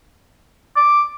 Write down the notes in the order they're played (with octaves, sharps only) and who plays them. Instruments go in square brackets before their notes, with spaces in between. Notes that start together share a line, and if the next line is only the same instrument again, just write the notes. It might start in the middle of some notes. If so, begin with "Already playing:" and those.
[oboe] D6